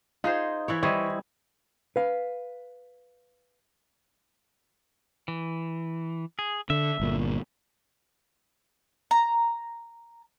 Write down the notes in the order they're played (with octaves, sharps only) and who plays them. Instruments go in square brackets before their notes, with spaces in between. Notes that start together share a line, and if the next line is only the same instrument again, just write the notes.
[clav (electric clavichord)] D#4 [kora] F4 G#4 C5
[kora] E3 E4 C#5
[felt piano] E3 C#6 G#6 [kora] G3 [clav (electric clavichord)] E4 C5 D#5
[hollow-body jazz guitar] B4 F5
[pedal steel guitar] E3
G#4
[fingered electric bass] D3 [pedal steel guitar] E5
[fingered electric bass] G1 A#2
[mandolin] A#5